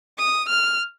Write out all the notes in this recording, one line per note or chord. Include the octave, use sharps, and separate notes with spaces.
D#6
F6